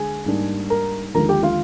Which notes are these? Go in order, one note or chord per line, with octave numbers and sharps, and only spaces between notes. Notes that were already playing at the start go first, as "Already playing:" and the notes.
Already playing: D3 G#3 G#4 G#5
G#2 G3 A#3 D4
A#4 A#5
D#2 D3 F3 G#3 A#4 A#5
G4 G5
F4 F5